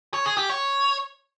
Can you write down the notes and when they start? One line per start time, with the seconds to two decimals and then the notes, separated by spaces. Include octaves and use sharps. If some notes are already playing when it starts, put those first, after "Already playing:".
0.14 C#5
0.26 G#4
0.38 G4
0.49 C#5